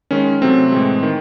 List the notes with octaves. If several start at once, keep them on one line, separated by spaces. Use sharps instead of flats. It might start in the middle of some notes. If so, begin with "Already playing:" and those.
D#3 G#3 C#4
C3 F#3 A3 C4
A2 E3 G#3
D#3